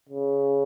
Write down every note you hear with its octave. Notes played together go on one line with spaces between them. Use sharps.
C#3